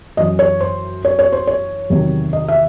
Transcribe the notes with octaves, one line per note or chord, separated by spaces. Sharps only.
F#2 E3 D#5
C#5
C5
C#5
C#5
C5
C#5
E2 C3 D#3 F#3
D#5
E5